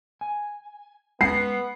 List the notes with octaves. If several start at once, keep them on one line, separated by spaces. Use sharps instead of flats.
G#5
G#3 B3 F#5 C7